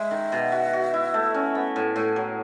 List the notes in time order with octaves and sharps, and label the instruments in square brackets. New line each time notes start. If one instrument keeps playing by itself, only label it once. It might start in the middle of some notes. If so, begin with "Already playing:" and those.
Already playing: [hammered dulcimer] G#3 [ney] E5
[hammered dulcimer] D#3
B2
F#4
F#4
E4
A3
C#4
B3
A2
A2
F#3